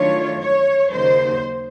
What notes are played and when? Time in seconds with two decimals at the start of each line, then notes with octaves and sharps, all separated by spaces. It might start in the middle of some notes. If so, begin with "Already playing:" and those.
Already playing: D#3 F#3 A3 D4 F4 C#5
0.41 C#5
0.92 D#2 C#3 F#3 A#3 D#4 C5